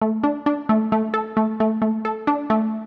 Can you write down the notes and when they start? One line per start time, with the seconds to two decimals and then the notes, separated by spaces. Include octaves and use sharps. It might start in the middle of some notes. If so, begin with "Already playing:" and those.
0.02 A3
0.24 D4
0.46 D4
0.69 A3
0.92 A3
1.14 A4
1.37 A3
1.60 A3
1.82 A3
2.05 A4
2.27 D4
2.50 A3